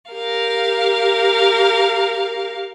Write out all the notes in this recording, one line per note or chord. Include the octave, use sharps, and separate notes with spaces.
G4 A#4 F5